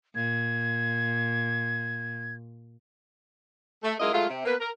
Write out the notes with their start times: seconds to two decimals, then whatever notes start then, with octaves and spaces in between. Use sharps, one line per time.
0.15 A#2 G#6
3.83 A3
3.99 F#2 G#3 E4 F4 A#4 D#5
4.13 F#3 G#3 A3 F4
4.29 C3
4.45 A#3 B3 A#4 B4
4.60 A#4